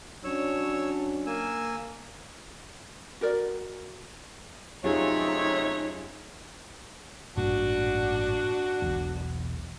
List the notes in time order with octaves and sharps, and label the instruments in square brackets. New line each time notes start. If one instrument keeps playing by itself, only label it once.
[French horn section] F#3 C#4 D4 [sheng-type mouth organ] C#5 E6
[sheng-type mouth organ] A#3 G#5 E6
[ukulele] F#4 A#4 D5
[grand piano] F#2 [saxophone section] C3 A3 C#5 [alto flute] D#4 [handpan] F4 G4 G#4
[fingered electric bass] A1 G2 A#2 [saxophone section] D4 F#4
[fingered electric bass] E1 B1